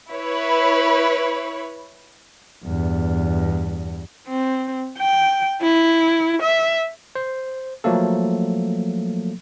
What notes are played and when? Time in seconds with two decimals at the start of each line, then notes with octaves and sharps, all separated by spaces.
0.12 E4 B4 C#5
2.64 E2 G2
4.28 C4
4.98 G5
5.61 E4
6.42 E5
7.15 C5
7.84 F3 F#3 A3 A#3 A4